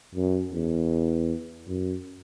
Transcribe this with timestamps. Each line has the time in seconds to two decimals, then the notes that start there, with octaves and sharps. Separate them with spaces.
0.15 F#2
0.53 E2
1.67 F#2